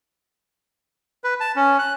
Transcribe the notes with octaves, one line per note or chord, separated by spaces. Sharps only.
B4
A5
C#4
F#6